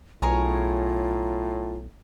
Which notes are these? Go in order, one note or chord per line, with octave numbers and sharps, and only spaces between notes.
B1 A2 F4 G#4 A#4 C#5